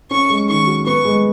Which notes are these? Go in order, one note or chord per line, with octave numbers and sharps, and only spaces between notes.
C#4 C#6
G#3
D#3 C#6
F#4
B3 C#6
G#3